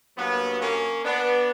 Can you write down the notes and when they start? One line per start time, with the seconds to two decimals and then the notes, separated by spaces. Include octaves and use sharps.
0.18 G2 F#3 A#3 B3
0.61 A#3 C#4
1.05 B3 D4